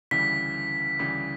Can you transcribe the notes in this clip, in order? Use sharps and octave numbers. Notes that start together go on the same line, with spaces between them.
D2 C#3 E3 G3 B6
D2 C#3 E3 G3